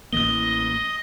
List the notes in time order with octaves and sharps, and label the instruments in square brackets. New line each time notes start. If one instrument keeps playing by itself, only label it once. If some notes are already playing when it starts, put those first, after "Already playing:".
[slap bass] A1 E3 A#3 [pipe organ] D#5 [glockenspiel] G7